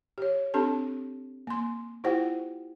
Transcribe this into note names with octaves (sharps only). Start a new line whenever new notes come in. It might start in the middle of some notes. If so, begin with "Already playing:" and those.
G4 C#5
C4 D4 G4 A4 A5
A#3 C6
E4 F4 G4 C5 F#5 G5